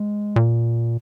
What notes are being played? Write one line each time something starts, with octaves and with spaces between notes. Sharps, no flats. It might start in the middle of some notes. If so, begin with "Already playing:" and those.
Already playing: G#3
A#2